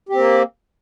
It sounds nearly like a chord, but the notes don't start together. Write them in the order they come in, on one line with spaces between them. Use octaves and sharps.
G4 C4 A#3